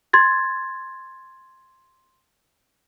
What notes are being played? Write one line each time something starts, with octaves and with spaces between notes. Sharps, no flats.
C6 G#6 A6